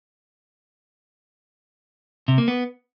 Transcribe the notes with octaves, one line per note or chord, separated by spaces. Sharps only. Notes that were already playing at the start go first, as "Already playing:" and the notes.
C3
A#3
B3